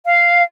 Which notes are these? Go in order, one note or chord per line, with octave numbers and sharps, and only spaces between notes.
F5